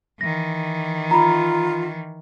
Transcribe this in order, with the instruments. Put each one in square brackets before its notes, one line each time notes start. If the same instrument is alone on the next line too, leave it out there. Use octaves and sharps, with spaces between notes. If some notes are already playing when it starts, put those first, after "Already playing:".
[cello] D#3 E3 [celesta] A#6
[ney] F4 [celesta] A#5 B5